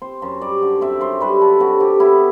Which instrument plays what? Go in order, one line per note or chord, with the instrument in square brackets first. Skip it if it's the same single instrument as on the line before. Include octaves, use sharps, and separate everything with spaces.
[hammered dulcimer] C4 C5
F#2
G3 D5
D3
C4 E5
F#2 C5
G3 B4
D3 A4
C3 F#4
C3 G4
B3 E4